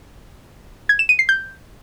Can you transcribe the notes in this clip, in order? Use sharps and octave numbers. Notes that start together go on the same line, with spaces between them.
G#6
E7
D#7
C7
G6